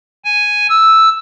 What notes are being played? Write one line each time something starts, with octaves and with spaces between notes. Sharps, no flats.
G#5
E6